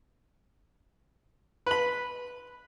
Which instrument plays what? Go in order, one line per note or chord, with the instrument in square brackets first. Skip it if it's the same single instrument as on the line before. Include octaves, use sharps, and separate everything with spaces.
[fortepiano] B4 B5